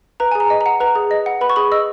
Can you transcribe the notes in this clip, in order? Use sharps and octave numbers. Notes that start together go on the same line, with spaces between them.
B4 A#5
G#4 G#5
A#5
D#5
A#5
F#5
B4 A#5
G#4
D#5
F#5
B4 B5
C#6
G#4 B5
D#5 E6